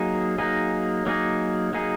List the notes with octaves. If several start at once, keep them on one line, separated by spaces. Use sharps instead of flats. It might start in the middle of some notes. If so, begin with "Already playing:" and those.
Already playing: F#3 A#3 D#4 G#4
F#3 A#3 D#4 G#4
F#3 A#3 D#4 G#4
F#3 A#3 D#4 G#4